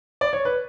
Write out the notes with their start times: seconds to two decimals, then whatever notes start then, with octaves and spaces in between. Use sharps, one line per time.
0.21 D5
0.33 C#5
0.45 B4